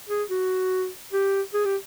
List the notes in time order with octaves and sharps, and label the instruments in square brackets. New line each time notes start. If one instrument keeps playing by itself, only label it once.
[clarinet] G#4
F#4
G4
G#4
G4